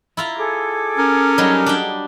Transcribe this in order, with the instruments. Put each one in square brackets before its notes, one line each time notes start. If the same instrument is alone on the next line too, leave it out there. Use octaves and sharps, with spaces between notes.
[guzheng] E4 F4 A#5
[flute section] G#4 A4 D6
[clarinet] C#4 [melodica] A#4
[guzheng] F#3 G3 D#4
D4 G4 G5